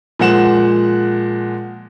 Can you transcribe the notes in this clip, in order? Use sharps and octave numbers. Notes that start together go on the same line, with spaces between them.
A#2 F3 G#3 F#5 E7